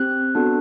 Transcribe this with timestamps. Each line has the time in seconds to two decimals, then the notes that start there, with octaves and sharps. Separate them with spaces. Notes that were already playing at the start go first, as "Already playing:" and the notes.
Already playing: C4 G4 F#6
0.35 B3 D4 F#4 A4